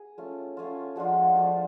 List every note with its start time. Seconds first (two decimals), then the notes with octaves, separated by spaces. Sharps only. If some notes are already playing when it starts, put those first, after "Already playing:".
Already playing: G#4
0.18 A3 C#4 F4
0.57 A3 C#4 F4
0.96 F3 G#3 D4 F4 F#5
1.36 F3 A3 D4 F4